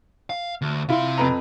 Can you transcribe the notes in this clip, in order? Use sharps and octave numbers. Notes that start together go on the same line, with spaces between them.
F5
D2
C3 E4 F4 C6
F2 B4 A#5